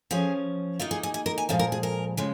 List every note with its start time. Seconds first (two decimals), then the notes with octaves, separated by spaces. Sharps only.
0.11 F3 C#4 G#4
0.79 D#3 A#3 D#4 F4
0.91 G#4
1.03 G#4
1.14 G#4
1.26 A#4
1.38 G#5
1.49 A#2 F3 G#3 F5
1.59 A#4
1.72 G#4
1.83 A#4
2.17 C#3 F3 G#3